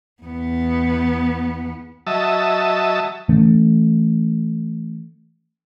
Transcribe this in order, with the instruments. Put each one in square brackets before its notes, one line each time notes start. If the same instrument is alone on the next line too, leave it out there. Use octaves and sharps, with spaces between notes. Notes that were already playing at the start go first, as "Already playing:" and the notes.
[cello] E2 B3
[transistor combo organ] F#3 D#5 E5 A5
[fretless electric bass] E3 A3 C#4